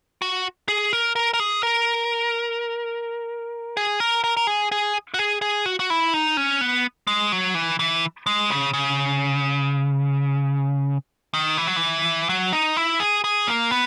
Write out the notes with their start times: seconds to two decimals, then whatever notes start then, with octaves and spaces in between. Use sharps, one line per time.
0.22 F#4
0.68 G#4
0.93 A#4
1.16 A#4
1.34 A#4
1.40 G#4
1.63 A#4
3.77 G#4
4.00 A#4
4.24 A#4
4.37 A#4
4.47 G#4
4.72 G#4
5.14 F#4
5.19 G#4
5.42 G#4
5.66 F#4
5.79 F#4
5.90 E4
6.14 D#4
6.37 C#4
6.61 B3
7.07 G#3
7.32 F#3
7.55 E3
7.79 E3
8.26 G#3
8.50 C#3
8.73 C#3
11.34 D#3
11.57 E3
11.67 F#3
11.76 E3
12.29 F#3
12.53 D#4
12.77 E4
13.00 G#4
13.24 G#4
13.48 A#3
13.71 B3